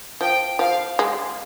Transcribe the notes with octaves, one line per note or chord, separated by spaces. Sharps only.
F3 G5
F3 F5
G#3